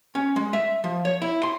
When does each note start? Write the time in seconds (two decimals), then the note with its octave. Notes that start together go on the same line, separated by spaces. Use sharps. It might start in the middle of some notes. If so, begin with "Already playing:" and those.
0.15 C#4
0.36 G#3
0.53 E5
0.84 F3
1.05 C#5
1.22 E4
1.43 C6